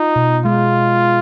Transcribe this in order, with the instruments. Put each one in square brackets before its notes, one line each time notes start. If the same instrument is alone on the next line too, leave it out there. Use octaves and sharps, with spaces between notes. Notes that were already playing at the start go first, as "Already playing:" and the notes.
Already playing: [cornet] D#4 [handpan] F4
[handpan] B2
[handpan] G#3 [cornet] F4